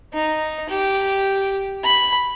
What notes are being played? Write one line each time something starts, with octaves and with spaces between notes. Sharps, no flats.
D#4
G4
B5